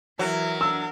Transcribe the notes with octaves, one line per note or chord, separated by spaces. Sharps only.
E3 F#3 E4 A#4
D4 E6